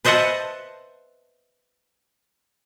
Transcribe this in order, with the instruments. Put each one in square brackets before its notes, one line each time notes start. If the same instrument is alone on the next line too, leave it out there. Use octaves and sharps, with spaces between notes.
[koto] B4 C5 D#5 E5 F#5 A5